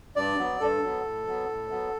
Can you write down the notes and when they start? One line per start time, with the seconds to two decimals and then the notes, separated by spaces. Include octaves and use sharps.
0.16 G2 D5
0.38 F#3 B3
0.60 G2 A4
0.82 F#3 B3
1.05 A2
1.27 F#3 B3
1.49 A2
1.70 F#3 B3